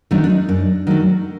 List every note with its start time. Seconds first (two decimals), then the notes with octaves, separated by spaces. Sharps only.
0.11 D#3 F#3 A3 D4
0.24 D4
0.30 D#4
0.49 F#2 D4
0.87 D#3 F#3 A3